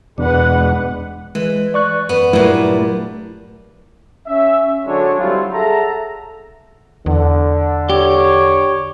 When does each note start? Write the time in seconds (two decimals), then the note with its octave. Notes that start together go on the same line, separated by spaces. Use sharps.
0.18 E2 B2 G#3 D4 B4 F#5
1.35 E3 G#3
1.74 D5 C#6 F#6
2.09 F#2 B3 B4
2.33 G2 A#2 F#3 A3 E4
4.28 C#4 E5
4.86 D3 F#3 G#3 D4 C#5
5.19 F#3 G3 C4 E4 F4
5.53 G#4 A4 E5 F#5 A5 A#5
7.06 E2 D3
7.90 G4 C#5 D6